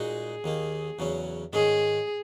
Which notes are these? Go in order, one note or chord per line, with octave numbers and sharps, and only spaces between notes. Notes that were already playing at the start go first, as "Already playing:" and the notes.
Already playing: A#2 G#3 D#4 F#4 G#4
D#2 D#3 A#3
E2 C#3 F#3 C#4
G#2 D#3 G#3 C#4 G#4